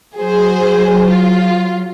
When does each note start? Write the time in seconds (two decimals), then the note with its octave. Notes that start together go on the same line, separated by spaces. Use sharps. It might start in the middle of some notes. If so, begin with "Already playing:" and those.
0.17 F#3 G#4 C5
1.09 F4